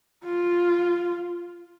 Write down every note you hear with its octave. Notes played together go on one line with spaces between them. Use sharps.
F4